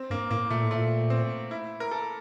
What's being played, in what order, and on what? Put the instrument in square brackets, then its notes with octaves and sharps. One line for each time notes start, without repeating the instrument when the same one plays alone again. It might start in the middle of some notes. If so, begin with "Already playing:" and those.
Already playing: [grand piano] C4
[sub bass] G2 [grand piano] A#3
[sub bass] A2 [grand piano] A#3
[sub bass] A#2 [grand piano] A3
[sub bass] A2
[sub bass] A#2 [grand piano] A3
[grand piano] C4
E4
A#4
A4